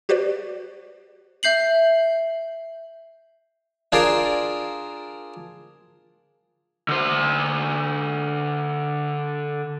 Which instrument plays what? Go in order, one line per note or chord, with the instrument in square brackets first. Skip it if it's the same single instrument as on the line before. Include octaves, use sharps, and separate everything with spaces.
[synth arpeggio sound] F#4 G4 B4 C5 D5
[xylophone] E5 G6 C7 F#7
[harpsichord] D4 F4 G#4 A#4 C5 D5
[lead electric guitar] D3 C5